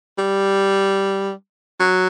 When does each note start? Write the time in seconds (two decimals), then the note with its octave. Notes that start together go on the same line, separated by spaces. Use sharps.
0.18 G3
1.80 F#3